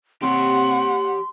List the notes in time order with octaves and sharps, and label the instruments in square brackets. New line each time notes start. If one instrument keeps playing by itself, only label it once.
[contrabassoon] C3 [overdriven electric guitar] G4 C#5 [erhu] F#5 [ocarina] C6